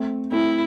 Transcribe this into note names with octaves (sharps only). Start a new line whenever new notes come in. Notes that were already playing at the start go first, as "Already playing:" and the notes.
Already playing: A3 C4
A3 C4 E4